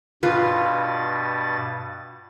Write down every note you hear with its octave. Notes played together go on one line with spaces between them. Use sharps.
G2 B2 F4 B4 A6